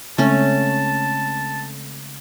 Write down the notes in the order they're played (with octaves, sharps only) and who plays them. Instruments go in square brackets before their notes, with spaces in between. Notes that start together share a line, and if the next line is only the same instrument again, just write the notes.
[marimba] C#3 G#3 C4 [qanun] A3 C#4 [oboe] A5